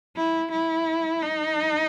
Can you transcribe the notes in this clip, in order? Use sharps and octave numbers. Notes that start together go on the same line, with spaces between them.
E4
E4
D#4